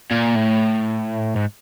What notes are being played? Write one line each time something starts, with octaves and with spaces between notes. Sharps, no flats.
A#2
A2
G#2